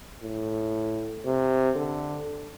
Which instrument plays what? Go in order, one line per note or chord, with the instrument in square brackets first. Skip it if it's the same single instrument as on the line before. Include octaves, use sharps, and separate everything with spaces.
[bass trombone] A2
C3
D3